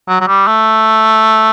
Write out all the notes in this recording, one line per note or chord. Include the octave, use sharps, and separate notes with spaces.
F#3
F#3
G3
A3